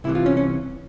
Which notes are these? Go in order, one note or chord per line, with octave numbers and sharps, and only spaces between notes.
C2 C3 E3 E4
F4
C#4
C#4